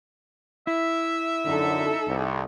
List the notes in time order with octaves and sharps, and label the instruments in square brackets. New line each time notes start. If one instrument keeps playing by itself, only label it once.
[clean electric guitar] E4 [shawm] E5
[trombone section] F#2 D3 [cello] D#4 A4
[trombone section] C2